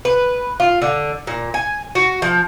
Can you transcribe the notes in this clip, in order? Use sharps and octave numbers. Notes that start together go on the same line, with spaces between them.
B4
F4
D3
A#2
G#5
F#4
F3